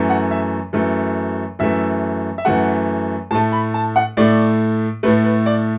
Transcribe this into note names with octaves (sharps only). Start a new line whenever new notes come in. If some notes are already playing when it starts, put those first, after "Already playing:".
Already playing: F#2 E3 A3
F#5
E5
F#2 E3 A3
F#2 E3 A3 E5
E5
F#2 E3 A3 F#5
A2 A3 A5
B5
A5
F#5
A2 A3 D5
A2 A3 B4
B4
D5